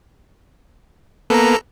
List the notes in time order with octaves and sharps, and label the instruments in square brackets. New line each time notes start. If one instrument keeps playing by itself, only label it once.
[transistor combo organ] A#3 B3 [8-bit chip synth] A4 A#5